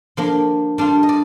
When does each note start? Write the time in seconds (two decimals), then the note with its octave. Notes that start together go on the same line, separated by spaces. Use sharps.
0.17 F3 A#3 D4
0.78 G3 D4 F4
1.03 D#5
1.09 D5